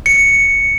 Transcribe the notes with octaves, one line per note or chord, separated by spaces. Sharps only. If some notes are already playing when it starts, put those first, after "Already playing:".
C#7